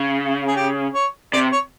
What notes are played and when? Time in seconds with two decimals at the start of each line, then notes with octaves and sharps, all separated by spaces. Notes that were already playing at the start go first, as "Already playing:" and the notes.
Already playing: C#3
0.47 G#4
0.56 G4
0.94 C#5
1.33 C3 D5
1.52 C#5